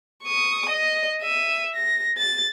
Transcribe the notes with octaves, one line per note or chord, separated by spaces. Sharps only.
C#6 D#6
D#5
E5 D#7
A#6
A6